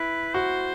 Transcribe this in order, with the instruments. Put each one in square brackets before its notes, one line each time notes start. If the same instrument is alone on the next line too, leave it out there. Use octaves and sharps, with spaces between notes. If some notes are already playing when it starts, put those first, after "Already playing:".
Already playing: [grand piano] E4 [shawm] B4
[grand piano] F#4 [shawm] C5